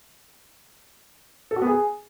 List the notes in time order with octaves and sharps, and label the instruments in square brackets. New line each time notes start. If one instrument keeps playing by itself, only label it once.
[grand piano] A4
F#4
B3
G#4